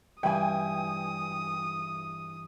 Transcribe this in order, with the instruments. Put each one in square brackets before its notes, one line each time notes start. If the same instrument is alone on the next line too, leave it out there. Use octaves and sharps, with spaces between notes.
[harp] G2 E3 [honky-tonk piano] G5 G#5 [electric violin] D#6